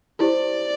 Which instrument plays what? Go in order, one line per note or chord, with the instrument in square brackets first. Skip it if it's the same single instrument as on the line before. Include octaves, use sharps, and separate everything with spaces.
[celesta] E4 G4 C5 [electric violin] D5